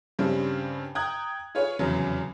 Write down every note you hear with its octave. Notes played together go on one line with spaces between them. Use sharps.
G2 C#3 G3 C4 D4 G4
G5 A#5 D#6 F#6 G#6
F4 G#4 B4 C#5
F1 E2 C#3 F#3 B3